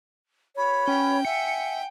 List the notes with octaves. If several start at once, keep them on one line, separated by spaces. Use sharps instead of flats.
F#4 B4 C#5 B5
C#4 G5
E5 F#5 G#5 C#7